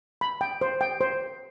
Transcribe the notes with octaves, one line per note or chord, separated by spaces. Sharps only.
B5
G5
C5
G5
C5